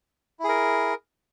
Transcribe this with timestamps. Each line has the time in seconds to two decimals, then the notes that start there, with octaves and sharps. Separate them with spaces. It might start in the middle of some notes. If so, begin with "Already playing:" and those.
0.39 E4
0.44 G#4
0.49 A#4